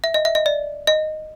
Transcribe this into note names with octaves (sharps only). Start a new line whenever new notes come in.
E5
D#5
E5
D#5
D5
D#5